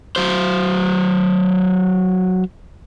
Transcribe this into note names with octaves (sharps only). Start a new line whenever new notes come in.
F#3 C5